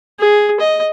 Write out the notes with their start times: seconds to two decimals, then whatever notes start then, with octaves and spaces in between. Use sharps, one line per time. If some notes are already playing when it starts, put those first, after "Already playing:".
0.20 G#4
0.60 D#5